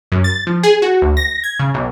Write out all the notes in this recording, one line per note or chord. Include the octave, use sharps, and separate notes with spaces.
F#2
A6
F3
G#4
F#4
D2
A#6
G#6
C#3
B1